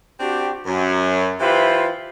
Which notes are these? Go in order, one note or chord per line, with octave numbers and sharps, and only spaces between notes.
C4 D4 F#4 G4
F#2
E3 F4 G4 B4 C5 E5